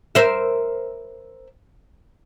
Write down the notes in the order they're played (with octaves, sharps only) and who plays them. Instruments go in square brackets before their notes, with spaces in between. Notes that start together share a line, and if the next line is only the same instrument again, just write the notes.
[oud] A#4 C5 E5